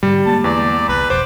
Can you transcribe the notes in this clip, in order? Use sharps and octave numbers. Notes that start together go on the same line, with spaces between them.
G#2 D3 G3
D3 G#3 A#3 A5
E2 D5
C2 B4
F1 F2 B2 C5 D6